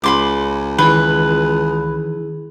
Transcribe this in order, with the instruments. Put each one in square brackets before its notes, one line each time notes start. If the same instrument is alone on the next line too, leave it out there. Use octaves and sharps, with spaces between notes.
[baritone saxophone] C#2 [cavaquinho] B5 C6 D6
[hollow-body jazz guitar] D#3 E3 [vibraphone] E4 G#4 [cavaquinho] B4